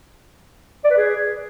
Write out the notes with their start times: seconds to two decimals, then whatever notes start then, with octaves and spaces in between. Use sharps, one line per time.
0.84 D5
0.91 B4
0.97 G#4